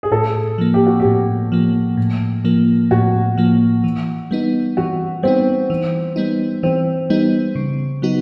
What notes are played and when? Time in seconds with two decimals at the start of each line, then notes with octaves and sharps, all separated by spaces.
0.03 G#4
0.11 A2 A4
0.58 F3 A#3
0.74 G4
0.87 F#4
1.00 G4
1.05 A2
1.52 F3 A#3
1.97 A2
2.45 F3 A#3
2.91 A2 F#4
3.38 F3 A#3
3.84 E3
4.31 G3 B3 D#4
4.77 E3 F#4
5.23 G3 B3 C4 D#4
5.70 E3
6.16 G3 B3 D#4
6.63 E3 C4
7.10 G3 B3 D#4
7.55 C#3
8.02 F#3 B3 D#4 F#4